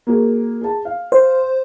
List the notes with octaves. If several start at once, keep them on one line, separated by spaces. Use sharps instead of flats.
A#3 F#4 G#4
G#4 A5
F5
C5